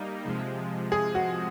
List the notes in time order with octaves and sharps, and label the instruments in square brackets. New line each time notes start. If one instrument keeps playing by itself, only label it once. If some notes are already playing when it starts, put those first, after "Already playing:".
Already playing: [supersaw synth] G3 A#3 D#4
C3 F3 G#3
[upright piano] G#4
F#4